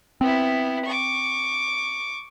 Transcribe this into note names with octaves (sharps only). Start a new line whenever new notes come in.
B3 C4 E4
C#6 D6